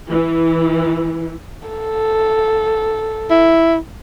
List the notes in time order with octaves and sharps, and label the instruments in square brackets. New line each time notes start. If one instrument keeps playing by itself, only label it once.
[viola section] E3
[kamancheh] A4
[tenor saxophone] E4